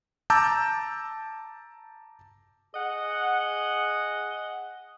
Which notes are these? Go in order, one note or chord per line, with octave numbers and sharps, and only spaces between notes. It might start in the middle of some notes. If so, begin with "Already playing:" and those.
A5 A#5 D6 E6 G6
G#4 D#5 F#5